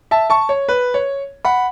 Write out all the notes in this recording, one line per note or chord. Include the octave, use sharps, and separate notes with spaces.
E5 A5
A5 C#6
C#5
B4
C#5
F#5 B5